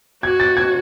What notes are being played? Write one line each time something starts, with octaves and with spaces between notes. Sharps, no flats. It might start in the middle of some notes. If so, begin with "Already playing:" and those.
F#4 G#6
A6
G#6